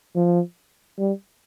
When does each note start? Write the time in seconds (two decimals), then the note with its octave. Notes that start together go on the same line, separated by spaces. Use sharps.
0.15 F3
0.99 G3